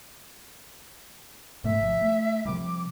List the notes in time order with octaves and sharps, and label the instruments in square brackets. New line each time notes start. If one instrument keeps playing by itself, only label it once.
[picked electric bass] G#2 C3 A3 [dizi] E5
[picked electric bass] G#1 F3
A3
[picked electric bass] C3 F3 G3 [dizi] D6